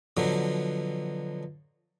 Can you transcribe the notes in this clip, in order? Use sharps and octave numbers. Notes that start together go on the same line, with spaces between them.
B2 D3 F3 F#3